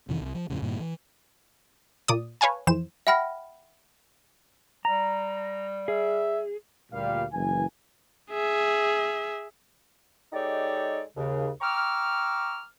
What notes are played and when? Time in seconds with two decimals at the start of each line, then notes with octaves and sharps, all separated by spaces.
0.09 F2 C3 D#3 E3
0.21 C2
0.35 F3
0.50 F2 A2 C#3
0.62 G2 A#2 D#3
0.80 E3
2.08 A#2 D5 D#6
2.41 B4 C#5 F5 G#5 A5
2.67 F2 E3 C5 E7
3.07 E5 F#5 G5 B5 F6 A#6
4.85 G3 A#5
5.88 G#4 E5
6.92 D2 A#2 G3 F5
7.32 F#1 E3 G#5
8.31 G#4 E5
10.33 G#3 D#4 G4 A4 C#5 D5
11.16 D#2 C#3
11.61 G5 A#5 C#6 D6 E6 F6